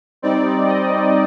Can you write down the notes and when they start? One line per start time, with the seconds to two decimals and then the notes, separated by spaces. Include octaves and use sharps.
0.22 G3 C4 D#4 D5
0.67 D#5